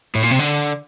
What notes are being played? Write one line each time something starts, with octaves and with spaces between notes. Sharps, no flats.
A2
A#2
C3
D3